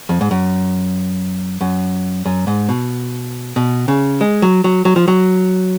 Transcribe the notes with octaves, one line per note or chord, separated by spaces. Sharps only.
F2
G#2
F#2
F#2
F#2
G#2
B2
B2
C#3
G#3
F#3
F#3
F#3
F3
F#3